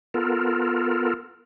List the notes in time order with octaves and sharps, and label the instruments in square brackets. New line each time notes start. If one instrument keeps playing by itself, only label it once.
[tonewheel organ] B3 F4 A4 A#4